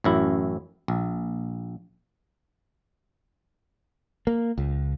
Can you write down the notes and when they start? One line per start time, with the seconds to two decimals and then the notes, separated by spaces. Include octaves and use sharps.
0.04 A1 F#2 E4
0.88 A#1
4.27 A#3
4.58 C#2